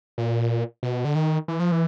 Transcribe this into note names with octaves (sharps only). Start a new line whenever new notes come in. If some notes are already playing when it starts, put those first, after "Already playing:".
A#2
B2
D3
D#3
E3
F3
E3